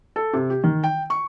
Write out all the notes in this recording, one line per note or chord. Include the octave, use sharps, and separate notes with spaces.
A4
C3
G4
D#3
G5
C#6